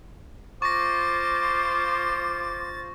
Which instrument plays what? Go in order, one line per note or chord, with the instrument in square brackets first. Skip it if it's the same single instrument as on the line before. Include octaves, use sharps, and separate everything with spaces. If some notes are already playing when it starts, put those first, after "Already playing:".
[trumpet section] F4 C5 [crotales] C#6 A#6 [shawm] D6 [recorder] A6